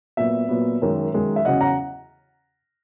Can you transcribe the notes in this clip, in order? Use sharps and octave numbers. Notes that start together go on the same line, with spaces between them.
A#2 F#3 B3 E5
A#2 F#3 B3
F#2 D#3 G#3
F#2 D#3 G#3
E5
E2 C#3 F#3 C#4 D#5 F#5
F#5 A#5